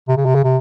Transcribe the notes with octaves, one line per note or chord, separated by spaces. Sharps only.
C3
C#3
C3
C#3
C3